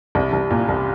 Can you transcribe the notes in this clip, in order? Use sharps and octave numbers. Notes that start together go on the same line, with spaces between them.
C2
C2
A#2
C2